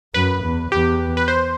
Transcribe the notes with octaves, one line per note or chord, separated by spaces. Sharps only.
F#2 B4
E2
E2 G4
B4
C5